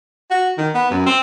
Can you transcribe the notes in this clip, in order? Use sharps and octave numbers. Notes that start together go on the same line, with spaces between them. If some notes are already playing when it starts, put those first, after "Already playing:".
F#4
D#3
B3
F#2
C4